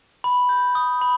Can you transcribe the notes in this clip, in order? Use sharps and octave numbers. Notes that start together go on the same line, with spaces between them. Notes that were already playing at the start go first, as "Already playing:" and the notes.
B5
G6
D#6
B5